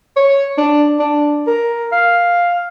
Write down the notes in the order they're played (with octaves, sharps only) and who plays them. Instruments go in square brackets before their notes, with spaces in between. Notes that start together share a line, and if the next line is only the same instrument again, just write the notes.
[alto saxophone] C#5
D4
D4
A#4
F5